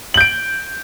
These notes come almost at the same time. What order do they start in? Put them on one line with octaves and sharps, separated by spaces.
F#7 G6 D7